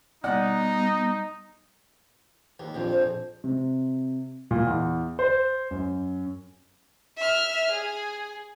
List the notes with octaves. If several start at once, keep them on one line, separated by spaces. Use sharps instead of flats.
B2 G3 B3 D#4 D5 F#5
D#2
A#1 F2
C5
C3
A#2
E2
C5
F#2
E5 F6
G#4